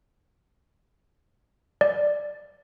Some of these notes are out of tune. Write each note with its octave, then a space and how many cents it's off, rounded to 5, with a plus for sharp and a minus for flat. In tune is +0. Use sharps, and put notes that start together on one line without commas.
D5 +5